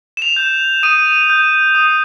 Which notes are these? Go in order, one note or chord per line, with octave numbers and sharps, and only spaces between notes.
E7
F7
G6
D#6 D#7
G6
D#6